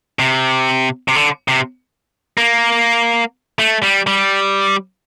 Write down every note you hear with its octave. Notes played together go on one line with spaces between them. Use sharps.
C3
C3
D3
C3
A#3
A3
G3
G3